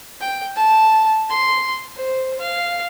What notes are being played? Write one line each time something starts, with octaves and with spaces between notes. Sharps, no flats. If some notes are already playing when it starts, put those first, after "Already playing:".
G5
A5
C6
C5
F5